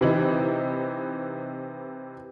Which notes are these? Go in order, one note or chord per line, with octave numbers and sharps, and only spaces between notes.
C3 E3 D#4